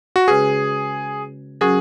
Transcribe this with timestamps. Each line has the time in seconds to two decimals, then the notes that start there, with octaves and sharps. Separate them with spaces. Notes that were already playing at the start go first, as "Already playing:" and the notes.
0.16 F#4
0.28 C#3 G#3 C#4 F#4 G#4 B4
1.61 F#3 C#4 F#4 G#4 A#4